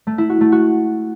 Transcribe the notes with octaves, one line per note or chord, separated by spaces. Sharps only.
A3
E4
F#4
A3
F#4